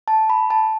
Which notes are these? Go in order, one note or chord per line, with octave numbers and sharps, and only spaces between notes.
A5
B5
A5